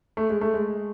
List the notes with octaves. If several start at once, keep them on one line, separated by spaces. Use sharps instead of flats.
A3
G#3
A3
G#3